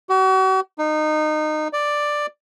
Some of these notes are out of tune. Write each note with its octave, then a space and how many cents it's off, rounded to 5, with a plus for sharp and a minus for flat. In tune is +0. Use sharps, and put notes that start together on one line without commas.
F#4 +40
D#4 -20
D5 +5